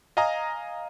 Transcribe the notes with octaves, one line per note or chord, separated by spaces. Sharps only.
D#5 F5 G#5 A#5 D#6